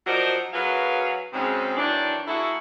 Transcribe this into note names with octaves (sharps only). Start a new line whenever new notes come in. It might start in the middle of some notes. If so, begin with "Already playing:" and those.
F3 F#3 D#4 A#4 C5 D5
F#2 F#3 C#4 G#4 B4 F5
G#2 C#3 F#3 G#3 C4
D#3 E3 F#3 D4
A#3 E4 F#4 G#4 A4